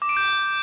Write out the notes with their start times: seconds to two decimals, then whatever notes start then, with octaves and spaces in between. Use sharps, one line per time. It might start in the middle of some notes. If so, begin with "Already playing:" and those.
0.02 D6
0.09 D7
0.17 G6